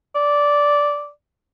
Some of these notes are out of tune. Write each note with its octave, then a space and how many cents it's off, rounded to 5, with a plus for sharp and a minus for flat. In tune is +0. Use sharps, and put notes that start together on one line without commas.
D5 -10